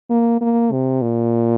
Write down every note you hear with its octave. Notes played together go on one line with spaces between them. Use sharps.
A#3
A#3
C3
A#2